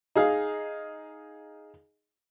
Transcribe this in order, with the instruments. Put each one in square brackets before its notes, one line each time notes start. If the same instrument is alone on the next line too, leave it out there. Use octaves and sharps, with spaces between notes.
[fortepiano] D#4 G#4 F5